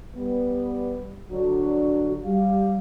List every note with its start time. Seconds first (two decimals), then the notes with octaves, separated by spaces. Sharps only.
0.16 G3 B3
1.31 D3 F#3 D4 F#4
2.25 G3 G4 F5